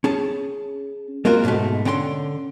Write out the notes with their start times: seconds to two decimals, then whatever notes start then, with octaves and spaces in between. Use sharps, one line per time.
0.04 C#4 G#4 A5
1.25 G#3 A#3 C4 F4 F#4 A#4
1.44 G#2 B2 D3 G#3 A3
1.85 D3 C#4 G5 A5 C6